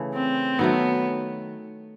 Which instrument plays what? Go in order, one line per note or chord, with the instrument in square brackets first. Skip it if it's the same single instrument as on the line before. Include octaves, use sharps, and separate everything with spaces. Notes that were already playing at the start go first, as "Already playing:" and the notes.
Already playing: [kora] C#3 E3 A3
[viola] C4
[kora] D#3 F#3 A3 [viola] B3